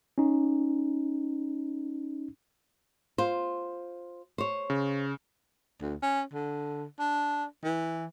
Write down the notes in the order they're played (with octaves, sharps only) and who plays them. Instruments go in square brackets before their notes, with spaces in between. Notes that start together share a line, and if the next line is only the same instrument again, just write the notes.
[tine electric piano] C#4 D#4
[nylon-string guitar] F4 C5
C5 C#5
[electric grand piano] C#3
[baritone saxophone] D2
C#4
D3
D4
E3